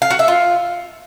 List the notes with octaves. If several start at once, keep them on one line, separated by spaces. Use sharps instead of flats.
F5
F#4
E5
F4